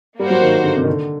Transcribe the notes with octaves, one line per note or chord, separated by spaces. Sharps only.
G3 A#3 F#4 C5
F#3
D#3
D3
C3
D#3
D3